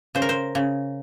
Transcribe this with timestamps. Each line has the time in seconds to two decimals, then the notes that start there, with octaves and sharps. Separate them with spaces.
0.15 C#3 C5
0.22 A#4
0.29 C5
0.55 C#3